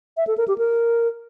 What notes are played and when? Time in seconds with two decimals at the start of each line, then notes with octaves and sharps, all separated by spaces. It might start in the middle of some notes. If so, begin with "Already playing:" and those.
0.17 E5
0.27 A4
0.38 A#4
0.48 G4
0.58 A#4